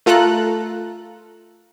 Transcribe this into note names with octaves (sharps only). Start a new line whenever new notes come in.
A3 F4 A4 A#5 F#6